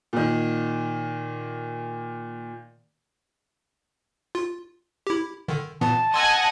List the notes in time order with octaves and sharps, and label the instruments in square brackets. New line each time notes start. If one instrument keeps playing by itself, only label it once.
[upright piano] A#2 D#3
[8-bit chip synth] F4
E4 G4
D3 D#3
[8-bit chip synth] A#2 E3 B3 [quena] A5
[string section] D#5 F#5 G#5 [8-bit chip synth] C6 E6 G#6